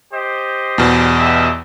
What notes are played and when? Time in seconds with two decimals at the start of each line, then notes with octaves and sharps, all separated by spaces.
0.14 G4 C5 D#5
0.78 E2 B2
1.19 G4 D#5 E5